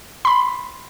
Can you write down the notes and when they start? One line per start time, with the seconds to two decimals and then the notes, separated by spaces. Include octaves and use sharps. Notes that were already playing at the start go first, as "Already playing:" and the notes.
0.25 B5 C6